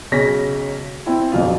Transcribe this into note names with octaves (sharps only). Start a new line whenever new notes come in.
B1 C#3 C#4 A#6 B6
C4 E4
D#1 A#1 F2 B2 F4